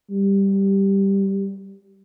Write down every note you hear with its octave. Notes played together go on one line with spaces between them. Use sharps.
G3